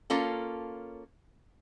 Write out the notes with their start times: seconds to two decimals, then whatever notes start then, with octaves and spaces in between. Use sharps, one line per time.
0.10 A#3 C#4 F4 A4